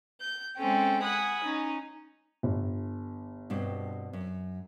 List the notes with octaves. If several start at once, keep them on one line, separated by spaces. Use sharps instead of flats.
G6
G#3 C4 C#4 A4 G5
F#5 G#5 B5 D#6
C#4 D#4
G1
G2 B2 C4
F#2